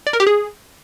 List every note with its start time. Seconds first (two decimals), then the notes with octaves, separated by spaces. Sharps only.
0.07 D5
0.13 A#4
0.20 G4
0.27 G#4